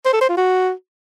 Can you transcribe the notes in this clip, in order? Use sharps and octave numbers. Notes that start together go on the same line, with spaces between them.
C5
A4
C5
F4
F#4